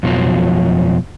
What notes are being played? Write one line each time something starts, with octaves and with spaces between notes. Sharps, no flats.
F2 B2 D3 F3 F#3